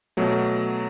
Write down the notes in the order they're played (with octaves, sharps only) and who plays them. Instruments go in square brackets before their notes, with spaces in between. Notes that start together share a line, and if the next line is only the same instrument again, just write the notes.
[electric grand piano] B2 F#3 A3